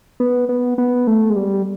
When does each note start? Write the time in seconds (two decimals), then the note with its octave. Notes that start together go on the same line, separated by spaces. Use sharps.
0.20 B3
0.49 B3
0.78 B3
1.07 A3
1.30 G#3
1.36 G3